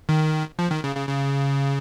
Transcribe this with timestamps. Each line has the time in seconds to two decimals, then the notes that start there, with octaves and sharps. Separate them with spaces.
0.09 D#3
0.59 F3
0.71 D#3
0.84 C#3
0.96 C#3
1.09 C#3